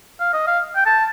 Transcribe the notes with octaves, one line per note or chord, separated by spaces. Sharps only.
F5
D#5
F5
G5
A5